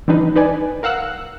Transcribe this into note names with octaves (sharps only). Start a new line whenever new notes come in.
E3 G3 D4 D#4 B4
D#4 B4 D5 G#5
A#4 F5 F#5 E6 F#6